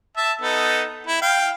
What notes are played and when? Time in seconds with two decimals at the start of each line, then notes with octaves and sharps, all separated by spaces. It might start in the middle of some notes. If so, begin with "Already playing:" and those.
0.17 E5 A5
0.41 B3 D#4 A4
1.07 E4
1.22 F5 G5